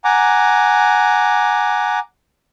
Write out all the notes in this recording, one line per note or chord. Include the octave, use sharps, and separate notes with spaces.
F#5 G#5 A#5 D6